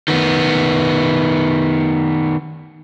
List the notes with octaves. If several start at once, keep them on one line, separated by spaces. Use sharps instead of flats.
D#3 B3